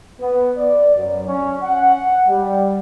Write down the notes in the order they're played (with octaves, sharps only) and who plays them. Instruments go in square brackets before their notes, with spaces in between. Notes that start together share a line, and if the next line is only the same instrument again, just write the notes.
[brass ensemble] B3
D5
F#2
C#4
F#5
G3